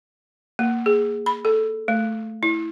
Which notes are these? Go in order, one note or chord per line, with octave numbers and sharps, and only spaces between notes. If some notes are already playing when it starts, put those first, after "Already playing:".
A#3
G#4
B5
A4
A3
E4